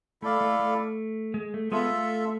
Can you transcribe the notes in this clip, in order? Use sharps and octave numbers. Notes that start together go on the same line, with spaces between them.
A3 E4 A4 D5 F5
A3
A3
G#3
A3
G#3 B3 F4 A4 E5
A3